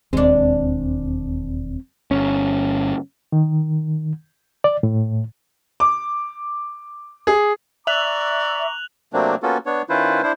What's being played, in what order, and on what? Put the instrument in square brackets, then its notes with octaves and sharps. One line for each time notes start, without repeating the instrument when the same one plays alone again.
[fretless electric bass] E1 D#2 [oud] G#3 D4 [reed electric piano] C4
[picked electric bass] G1 C#4
[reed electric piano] D#3
D5
A2
[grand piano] D6
G#4
[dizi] D5 [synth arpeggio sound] E5 [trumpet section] A#5 C#6 D6 [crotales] F#6 F7 F#7
[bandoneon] C3 F#3 A3 A#3 C4 D4
A#3 B3 C#4 F4 F#4 A4
B3 D4 C#5
D#3 C#4 E4 F4 B4 C5
D4 E4 C5